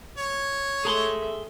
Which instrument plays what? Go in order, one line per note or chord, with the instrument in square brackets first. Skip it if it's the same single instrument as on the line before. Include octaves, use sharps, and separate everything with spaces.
[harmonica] C#5
[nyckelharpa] A3 E5 [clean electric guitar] G#4 A#5 C6